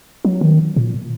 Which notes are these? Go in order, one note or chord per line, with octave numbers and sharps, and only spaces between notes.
F#3
D#3
A#2